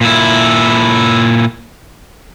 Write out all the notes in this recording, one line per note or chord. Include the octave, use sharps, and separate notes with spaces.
A#2 E4